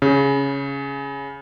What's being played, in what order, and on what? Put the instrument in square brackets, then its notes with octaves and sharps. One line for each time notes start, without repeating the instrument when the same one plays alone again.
[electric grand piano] C#3